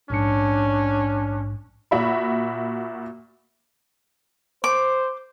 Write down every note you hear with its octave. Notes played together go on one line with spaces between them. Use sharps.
A#1 G#2 C#4 D4 C#7
A#2 F#4 E5 B5
C5 D6